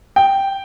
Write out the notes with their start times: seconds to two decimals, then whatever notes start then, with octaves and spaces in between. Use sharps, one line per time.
0.16 G5